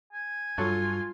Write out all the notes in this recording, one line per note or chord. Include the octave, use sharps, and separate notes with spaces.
G#5
G2 F#3 F4 A4 C#5